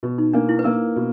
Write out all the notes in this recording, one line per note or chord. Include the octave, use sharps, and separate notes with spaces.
B2
D#4
A#3 D4
E4
B4
A#3 A#4
B2